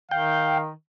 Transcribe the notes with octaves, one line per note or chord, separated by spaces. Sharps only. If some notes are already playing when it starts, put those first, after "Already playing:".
D#3 F5 G5